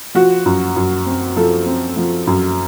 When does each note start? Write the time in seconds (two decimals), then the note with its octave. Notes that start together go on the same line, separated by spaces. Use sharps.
0.15 F3 F#4
0.46 F#2
0.76 F#2
1.06 C4
1.37 F3 A4
1.66 C4
1.97 F3
2.27 F#2